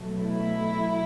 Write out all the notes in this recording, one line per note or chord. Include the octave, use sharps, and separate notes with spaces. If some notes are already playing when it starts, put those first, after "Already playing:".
Already playing: B2 F#3 A3
E4